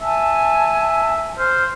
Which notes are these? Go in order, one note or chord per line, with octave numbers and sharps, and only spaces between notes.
E5 G#5 A5
C5 F6